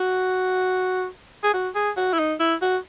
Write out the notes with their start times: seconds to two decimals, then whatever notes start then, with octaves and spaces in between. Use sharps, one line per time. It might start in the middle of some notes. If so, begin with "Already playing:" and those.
Already playing: F#4
1.44 G#4
1.53 F#4
1.75 G#4
1.97 F#4
2.13 E4
2.19 D#4
2.39 E4
2.62 F#4